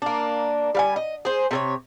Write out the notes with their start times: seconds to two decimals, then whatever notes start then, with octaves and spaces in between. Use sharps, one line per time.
0.02 A#3 D4
0.75 G3 F5 G#5
0.96 D#5
1.25 G#4 C5
1.51 C3 A4 C#5